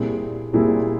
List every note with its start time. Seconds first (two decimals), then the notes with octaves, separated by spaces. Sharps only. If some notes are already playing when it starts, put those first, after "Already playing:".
Already playing: A#2 G3 C4 E4 G#4
0.53 A#2 G3 C4 E4 G#4